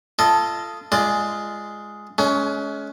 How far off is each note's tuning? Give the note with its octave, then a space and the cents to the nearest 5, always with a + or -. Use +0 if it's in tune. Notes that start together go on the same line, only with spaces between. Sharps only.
F4 -25 A4 +0 D#5 +0
G#3 +5 F4 -20 D5 +20
G#3 +35 C#4 +20